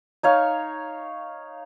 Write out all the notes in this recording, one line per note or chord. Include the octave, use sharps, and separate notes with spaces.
D#4 C#5 F5